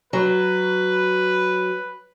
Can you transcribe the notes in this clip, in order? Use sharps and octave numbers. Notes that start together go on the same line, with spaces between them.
F#3 B4